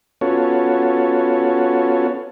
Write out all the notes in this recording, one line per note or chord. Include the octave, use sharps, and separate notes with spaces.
B3 C#4 F4 F#4 A4 C#5